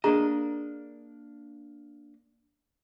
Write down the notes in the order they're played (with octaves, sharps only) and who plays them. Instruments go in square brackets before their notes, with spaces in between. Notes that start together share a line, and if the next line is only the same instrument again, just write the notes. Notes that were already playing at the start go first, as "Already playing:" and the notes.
[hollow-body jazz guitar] A#3 D4 D#5 [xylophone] G#4 A#5